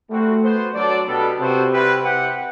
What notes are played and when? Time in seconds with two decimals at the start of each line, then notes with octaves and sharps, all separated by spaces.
0.09 G3 A3 C4 F#4
0.42 B3 F#4 C5
0.74 F#3 D4 A4 D5
1.06 B2 G3 B3 D4 A4
1.39 C3 B3 F#4 A4 C5 G5
1.71 G3 C4 E4 B4
2.03 C4 E4 G4 B4 F#5